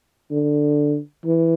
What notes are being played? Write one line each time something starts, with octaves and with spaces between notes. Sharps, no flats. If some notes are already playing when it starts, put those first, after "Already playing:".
D3
E3